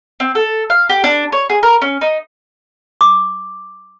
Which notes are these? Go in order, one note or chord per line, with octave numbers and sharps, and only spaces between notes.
C4
A4
F5
G4
D4
C#5
G#4
A#4
C#4
D#4
D6